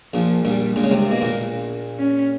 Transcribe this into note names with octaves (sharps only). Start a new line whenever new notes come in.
A#1 A#2 F3
A#1 A#2 G3
A#1 A#2 G#3
C#3
C2 C3
B2 A#3
A#1 A#2
C#4